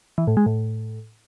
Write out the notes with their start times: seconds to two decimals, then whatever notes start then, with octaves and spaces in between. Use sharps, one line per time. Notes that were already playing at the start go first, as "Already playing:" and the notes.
0.18 E3
0.27 A2
0.37 G#3
0.46 A2